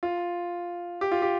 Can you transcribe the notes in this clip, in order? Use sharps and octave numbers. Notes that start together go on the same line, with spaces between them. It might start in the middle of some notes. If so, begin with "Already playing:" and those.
F4
G4
F4
G4